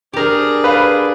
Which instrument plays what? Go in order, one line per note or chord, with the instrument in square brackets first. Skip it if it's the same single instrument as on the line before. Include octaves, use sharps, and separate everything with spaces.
[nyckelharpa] D4 G#4 [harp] G4 A#4
[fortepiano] B4 F5